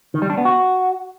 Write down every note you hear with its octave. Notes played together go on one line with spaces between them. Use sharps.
D#3
G3
D4
B3
F#4